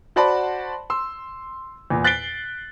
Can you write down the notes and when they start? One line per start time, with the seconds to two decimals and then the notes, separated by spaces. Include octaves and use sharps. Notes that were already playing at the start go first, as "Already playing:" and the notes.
0.16 F#4 C5 D5 F#5 A5 B5
0.90 C6 E6
1.90 E2 A#2
2.04 F#6 A6 B6 C7 D7 G7